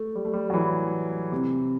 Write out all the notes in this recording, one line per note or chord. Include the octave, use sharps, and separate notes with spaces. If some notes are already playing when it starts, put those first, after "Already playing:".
Already playing: A3
G3
A3
G3
F#3
E3
C3